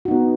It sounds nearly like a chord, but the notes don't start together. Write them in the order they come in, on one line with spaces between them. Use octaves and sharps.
F#4 D#4 B3